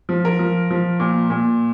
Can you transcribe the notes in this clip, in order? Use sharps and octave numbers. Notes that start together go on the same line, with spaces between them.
F3
A#4
F3
F3
A#2
A#2